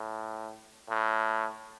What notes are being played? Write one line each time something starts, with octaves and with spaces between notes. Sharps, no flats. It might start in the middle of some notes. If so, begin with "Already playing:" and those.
Already playing: A2
A2